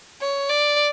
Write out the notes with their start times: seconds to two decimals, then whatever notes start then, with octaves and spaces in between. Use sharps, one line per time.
0.21 C#5
0.49 D5